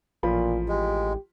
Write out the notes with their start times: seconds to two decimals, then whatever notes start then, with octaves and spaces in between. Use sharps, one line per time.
0.23 A1 A#2 F3 F4 B5
0.69 G#3 G4